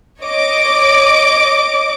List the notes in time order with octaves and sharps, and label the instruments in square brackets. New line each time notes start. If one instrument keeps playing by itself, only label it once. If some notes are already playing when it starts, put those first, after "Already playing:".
[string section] C#5 D#5 D6